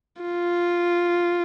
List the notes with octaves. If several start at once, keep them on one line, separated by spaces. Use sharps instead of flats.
F4